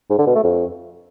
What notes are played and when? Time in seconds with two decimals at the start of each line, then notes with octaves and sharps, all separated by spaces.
0.10 G#2
0.18 D3
0.27 B2
0.35 A3
0.44 F2